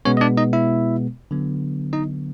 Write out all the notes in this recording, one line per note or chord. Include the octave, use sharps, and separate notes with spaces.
B2 G#3 B3 C#4 C#5
D#5
D4 D5
D#4 D#5
E4 E5
D3 F#3 B3
D#4 D#5